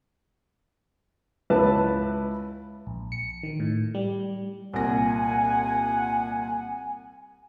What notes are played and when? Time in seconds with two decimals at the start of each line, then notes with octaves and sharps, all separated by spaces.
1.50 C#2 E4 B4 A5
2.87 A#1
3.12 C#7
3.43 D#3
3.60 A2
3.95 G3
4.74 C2 A#2 F#5 G#5 A#6